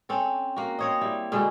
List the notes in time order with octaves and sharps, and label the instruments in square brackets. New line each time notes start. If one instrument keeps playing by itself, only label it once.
[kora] C4 C#4 A4
A#3 F#4
C4 C#5 D#5
G3 E4
B2 D3 G#3 G#4